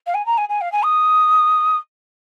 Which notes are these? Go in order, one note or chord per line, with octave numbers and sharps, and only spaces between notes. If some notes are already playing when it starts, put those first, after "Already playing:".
F5
G#5
A#5
G#5
G#5
F5
G#5
D#6